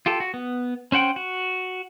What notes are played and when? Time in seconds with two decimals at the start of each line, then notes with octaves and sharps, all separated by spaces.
0.06 F4 G4 A4
0.20 F#4
0.34 B3
0.92 C#4 C5 F#5 G5
1.16 F#4